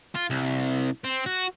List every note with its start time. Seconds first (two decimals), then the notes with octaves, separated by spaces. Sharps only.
0.15 F4
0.30 C2
1.04 C4
1.26 F#4